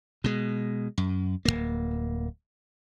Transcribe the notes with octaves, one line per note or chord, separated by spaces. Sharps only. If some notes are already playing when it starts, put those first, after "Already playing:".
B2 G#3
F#2
D1 E2 A#3